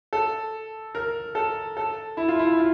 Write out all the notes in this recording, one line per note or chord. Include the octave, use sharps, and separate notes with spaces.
A4
A#4
A4
A4
E4
F4
E4
F4